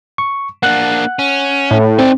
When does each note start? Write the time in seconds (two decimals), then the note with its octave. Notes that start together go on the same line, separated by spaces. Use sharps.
0.18 C#6
0.63 A#3 D4 F#5 F#6
1.19 C#4
1.71 A2
1.99 C4 D#4 D5